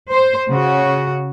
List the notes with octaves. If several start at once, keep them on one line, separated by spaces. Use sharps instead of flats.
C5
C#3 F#4